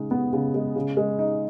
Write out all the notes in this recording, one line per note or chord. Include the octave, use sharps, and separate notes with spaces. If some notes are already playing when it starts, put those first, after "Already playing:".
Already playing: C#3 G#3 D#4
B3
C#3
G#3
C#3
G#3
D#4